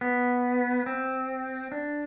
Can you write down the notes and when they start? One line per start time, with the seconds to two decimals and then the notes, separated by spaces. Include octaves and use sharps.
0.01 B3
0.86 C4
1.72 D4